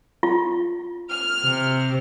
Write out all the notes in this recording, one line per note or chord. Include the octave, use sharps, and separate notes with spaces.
F4
F6
C3